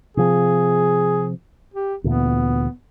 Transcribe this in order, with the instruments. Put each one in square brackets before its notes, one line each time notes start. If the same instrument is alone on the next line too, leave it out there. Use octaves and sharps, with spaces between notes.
[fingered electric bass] C3 F3 C4 [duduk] G#4
[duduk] G4
[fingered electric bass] D2 A#2 E3 [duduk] B3